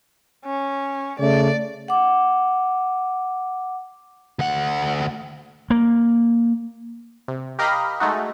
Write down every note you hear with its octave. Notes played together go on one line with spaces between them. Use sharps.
C#4
C#3 A3 D5
F#5 D6
D2 F#5
A#3
C3
G4 A#4 D#5 F5 A#5 B5
G#3 A3 D#4 F#4